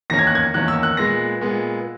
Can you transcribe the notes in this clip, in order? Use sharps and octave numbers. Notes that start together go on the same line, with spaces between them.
E2 D#3 A#3 C#4 A#6
G#6
F#6
G#6
E2 D#3 A#3 C#4 F#6
E6
F#6
A#2 G#3 B3 A#6
A#2 G#3 B3